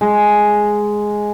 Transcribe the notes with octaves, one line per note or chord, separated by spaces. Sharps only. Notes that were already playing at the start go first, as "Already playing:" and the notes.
G#3